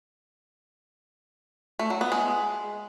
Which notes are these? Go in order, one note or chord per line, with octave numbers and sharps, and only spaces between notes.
A3
F#3
B3
G#3